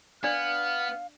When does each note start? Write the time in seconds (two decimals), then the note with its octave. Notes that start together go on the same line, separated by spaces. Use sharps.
0.24 B3 D4 D5 F5 F6